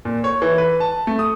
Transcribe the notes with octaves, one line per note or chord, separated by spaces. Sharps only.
A#2
C#5
E3
B4
A5
A3
D#6